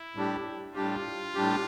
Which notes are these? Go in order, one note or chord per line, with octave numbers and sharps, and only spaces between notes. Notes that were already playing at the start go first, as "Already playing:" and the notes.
Already playing: E4
A2 G3 D4 G4
A2 G3 D4 F4 G4
A2 G3 D4 G4